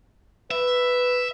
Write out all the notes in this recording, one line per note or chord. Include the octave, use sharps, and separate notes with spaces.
B4 E5